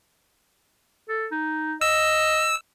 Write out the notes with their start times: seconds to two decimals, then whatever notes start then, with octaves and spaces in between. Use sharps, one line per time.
1.09 A4
1.32 D#4
1.81 D#5 E6